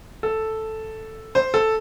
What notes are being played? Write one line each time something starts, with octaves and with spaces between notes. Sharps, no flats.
A4
C5
A4